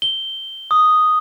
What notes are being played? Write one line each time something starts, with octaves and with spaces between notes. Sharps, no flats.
G7
D#6